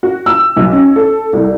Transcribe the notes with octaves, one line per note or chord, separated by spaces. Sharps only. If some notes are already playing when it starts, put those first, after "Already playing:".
F#4
E6
B1
C#4
A4
C2